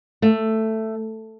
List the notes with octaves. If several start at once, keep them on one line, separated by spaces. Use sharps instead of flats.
A3